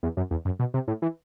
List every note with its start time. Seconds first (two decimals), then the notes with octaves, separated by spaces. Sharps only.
0.03 E2
0.17 F#2
0.31 E2
0.45 F#2
0.59 B2
0.74 C3
0.88 A2
1.02 E3